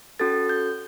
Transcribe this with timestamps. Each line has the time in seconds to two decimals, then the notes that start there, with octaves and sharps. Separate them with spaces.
0.19 C#4 F#4 A4 A6
0.49 G6